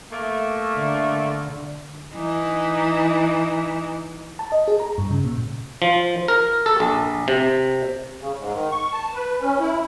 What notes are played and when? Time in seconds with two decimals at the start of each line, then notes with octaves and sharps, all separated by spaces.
0.11 A3 A#3
0.77 D3
2.13 E3 D#4
4.39 A5
4.52 D#5
4.68 G#4
4.80 A#5
4.98 G2
5.11 C#3
5.24 A#2
5.82 F3
6.28 A#4
6.66 A4
6.80 A#1
7.28 C3
8.20 C#3
8.38 G#2
8.53 D#3
8.71 C#6
8.92 A5
9.14 B4
9.41 C#4
9.60 E4